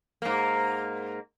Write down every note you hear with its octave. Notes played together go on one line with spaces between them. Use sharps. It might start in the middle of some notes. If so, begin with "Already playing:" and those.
G#2 A#3